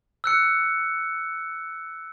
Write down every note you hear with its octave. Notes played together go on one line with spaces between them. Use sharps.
E6 F#6 C#7